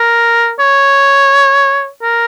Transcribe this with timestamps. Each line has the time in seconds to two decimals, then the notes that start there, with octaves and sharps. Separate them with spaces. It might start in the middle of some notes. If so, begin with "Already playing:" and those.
Already playing: A#4
0.59 C#5
2.02 A#4